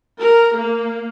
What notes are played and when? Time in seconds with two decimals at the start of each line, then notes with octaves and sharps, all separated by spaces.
0.20 A#4
0.56 A#3